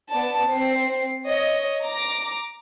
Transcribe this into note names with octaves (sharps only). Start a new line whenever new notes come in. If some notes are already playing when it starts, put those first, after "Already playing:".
B3 D5 A5
C4 C7
C#5 D#5
A#5 D6